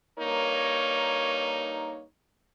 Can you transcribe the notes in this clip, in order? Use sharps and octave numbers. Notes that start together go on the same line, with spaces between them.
G2 A#3 D#4 A#4 C#5